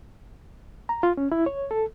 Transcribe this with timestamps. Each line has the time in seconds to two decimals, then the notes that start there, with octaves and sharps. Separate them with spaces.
0.89 A#5
1.03 F4
1.17 C#4
1.32 E4
1.46 C#5
1.71 A4